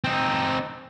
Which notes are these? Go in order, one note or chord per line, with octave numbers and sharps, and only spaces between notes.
C4 D#4